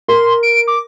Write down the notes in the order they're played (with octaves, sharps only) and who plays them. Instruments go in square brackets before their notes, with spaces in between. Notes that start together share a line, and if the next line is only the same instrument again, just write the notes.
[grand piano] A#4 [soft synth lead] C6
[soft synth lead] D7
D6